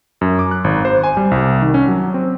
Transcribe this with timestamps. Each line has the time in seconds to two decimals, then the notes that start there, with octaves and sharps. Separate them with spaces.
0.21 F#2
0.39 D6
0.51 F#6
0.64 G#1
0.85 C5
1.04 G#5
1.17 G3
1.31 C2
1.62 D#3
1.74 C#4
1.88 F#3
2.14 C4